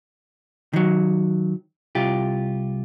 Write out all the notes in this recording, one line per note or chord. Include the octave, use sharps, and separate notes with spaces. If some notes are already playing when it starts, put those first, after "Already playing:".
D#3 F#3
C2 F4 G4